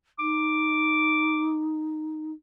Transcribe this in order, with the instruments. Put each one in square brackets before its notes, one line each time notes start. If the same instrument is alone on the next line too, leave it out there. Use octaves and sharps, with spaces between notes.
[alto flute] D#4 [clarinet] D6